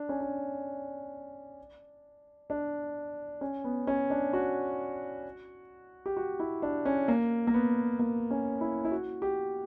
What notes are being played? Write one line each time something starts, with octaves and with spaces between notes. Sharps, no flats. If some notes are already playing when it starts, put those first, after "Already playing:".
Already playing: D4
C#4
D4
D4
C#4
B3
C#4
D4
F#4
G4
F#4
E4
D4
C#4
A#3
A#3
B3
A#3
C#4
E4
E4
F#4
G4